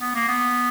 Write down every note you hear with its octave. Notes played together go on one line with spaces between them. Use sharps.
B3
A#3
B3